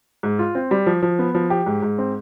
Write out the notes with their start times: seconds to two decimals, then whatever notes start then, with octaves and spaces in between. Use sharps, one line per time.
0.23 G#2
0.39 F4
0.55 C4
0.71 G3
0.87 F3
1.03 F3
1.19 B3
1.35 F3
1.50 G4
1.66 G#2
1.82 G#2
1.98 C4